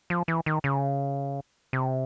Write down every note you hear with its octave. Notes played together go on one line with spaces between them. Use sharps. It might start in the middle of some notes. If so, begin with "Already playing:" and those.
F3
E3
D#3
C#3
C3